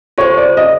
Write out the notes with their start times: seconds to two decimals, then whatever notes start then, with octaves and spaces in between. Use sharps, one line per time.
0.18 F4 A4 C5 C#5
0.37 D5
0.57 D#5